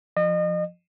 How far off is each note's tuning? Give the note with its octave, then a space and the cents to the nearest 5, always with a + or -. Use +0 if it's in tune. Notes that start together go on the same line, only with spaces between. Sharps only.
F3 +0 D#5 -35